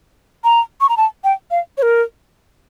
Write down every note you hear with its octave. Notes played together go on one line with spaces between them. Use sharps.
A#5
C#6
A#5
A5
G5
F5
C#5
A#4